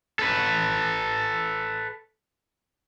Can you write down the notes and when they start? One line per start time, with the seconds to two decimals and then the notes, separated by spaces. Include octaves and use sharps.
0.19 A4 B4